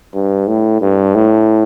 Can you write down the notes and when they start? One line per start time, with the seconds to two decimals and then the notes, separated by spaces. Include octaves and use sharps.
0.14 G2
0.47 A2
0.81 G2
1.14 A2